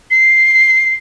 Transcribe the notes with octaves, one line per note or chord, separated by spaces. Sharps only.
C7